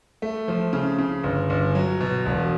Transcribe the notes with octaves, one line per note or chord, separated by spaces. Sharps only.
A3
F3
C#3
C#3
G1
G1
F#3
B2
E1